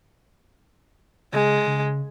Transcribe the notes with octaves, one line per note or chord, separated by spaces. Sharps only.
C#3 G#3
C#3